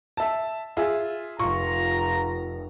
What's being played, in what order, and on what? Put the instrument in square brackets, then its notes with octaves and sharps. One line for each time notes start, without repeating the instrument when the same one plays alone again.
[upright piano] E5 A5
F4 G#4 E5
[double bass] F1 [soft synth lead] F4 [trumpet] A#5 [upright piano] C#6